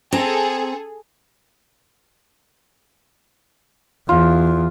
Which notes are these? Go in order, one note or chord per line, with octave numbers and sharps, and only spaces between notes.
C4 G#4 A4 A#5
E2 F4